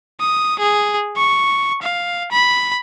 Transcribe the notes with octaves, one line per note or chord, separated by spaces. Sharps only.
D#6
G#4
C#6
F5
B5